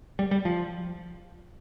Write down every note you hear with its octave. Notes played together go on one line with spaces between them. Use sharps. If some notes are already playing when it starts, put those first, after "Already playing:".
G3
G3
F3